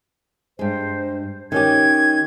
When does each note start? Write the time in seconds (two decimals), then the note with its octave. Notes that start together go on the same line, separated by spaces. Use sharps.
0.59 G2 G#3 C5
1.52 D#3 C#4 G4 G#6